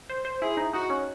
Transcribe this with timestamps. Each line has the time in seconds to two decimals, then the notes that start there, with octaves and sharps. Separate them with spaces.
0.09 C5
0.25 C5
0.42 E4 G#4
0.57 D#4
0.73 D#4 F#4
0.90 C#4